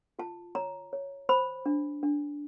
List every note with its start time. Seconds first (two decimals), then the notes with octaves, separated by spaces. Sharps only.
0.19 F4 A5
0.55 C#5 A#5
0.93 C#5
1.29 C5 B5
1.66 D4
2.03 D4